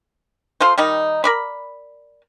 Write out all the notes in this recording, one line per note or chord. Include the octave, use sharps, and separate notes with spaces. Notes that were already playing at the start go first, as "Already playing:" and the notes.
F4 A4 C5
D#3 G3 D#4
A#4 D5 B5